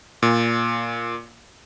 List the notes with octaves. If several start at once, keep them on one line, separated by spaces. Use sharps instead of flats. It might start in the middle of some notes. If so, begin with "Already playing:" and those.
A#2